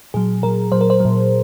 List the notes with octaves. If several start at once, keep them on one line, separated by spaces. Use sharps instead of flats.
A#2 F#3 G#4
A#2 F#3 A#4
A#2 F#3 C5
A#4
C5
A#2 F#3